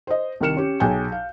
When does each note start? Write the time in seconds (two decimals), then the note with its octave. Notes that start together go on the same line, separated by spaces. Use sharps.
0.07 C5 D#5
0.40 C2 D#3 A#4 F6 C#7 E7
0.57 C#4 G4
0.80 B1 G#4 G5 G#5 G6
1.12 F5